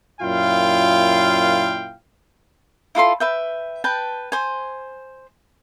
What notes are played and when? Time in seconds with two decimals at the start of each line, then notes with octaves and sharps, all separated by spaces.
0.21 F#2 A#2 E4 F4 F5 G5
2.95 E4 F4 A4 C6
3.20 B4 E5 G5
3.84 B4 G5 A5
4.32 C5 G#5